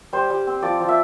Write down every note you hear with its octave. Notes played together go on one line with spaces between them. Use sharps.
G3 C5
G3
C4
F3 D5
F3
E5